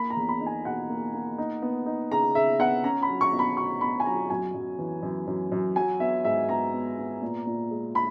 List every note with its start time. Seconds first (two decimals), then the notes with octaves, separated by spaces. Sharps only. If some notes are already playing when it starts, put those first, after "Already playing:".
Already playing: A#3 B5
0.10 A#5
0.17 E2
0.28 B5
0.40 D#4
0.46 G#5
0.65 B2 F#5
0.89 A#3
1.14 A#3
1.38 D#4
1.62 B3
1.86 D#4
2.11 C#3 A#5
2.35 C#3 E5
2.60 B3 F#5
2.84 C#4 A#5
3.02 B5
3.09 F#3
3.21 C#6
3.33 B2
3.39 B5
3.57 B2 C#6
3.81 B2 B5
4.00 G#5
4.06 F#3 A#5
4.30 F#2 G#5
4.54 F#2
4.79 E3
5.03 F#2
5.27 F#2
5.52 F#2
5.76 F#3 G#5
6.00 B3 E5
6.25 G#2 E5
6.49 B3 A#5
6.73 B3
6.98 B3
7.22 A#2
7.47 A#2
7.71 G#3
7.95 B5